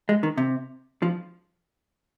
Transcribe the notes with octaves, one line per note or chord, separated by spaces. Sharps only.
G#3
D#3
C3
F3